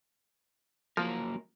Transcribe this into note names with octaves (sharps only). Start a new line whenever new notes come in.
F3 F#3 A#3 A#4